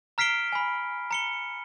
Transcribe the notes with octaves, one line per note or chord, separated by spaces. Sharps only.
A#5 F6 B6 C7 D7 G7
G#5 B5
A#5 C#7 G7